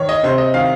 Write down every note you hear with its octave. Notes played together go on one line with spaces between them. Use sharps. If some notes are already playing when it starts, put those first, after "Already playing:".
Already playing: D#3 C#5
D#5
C3 C5
D#5
D#3 F5